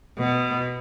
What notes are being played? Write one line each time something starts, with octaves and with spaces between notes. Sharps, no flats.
B2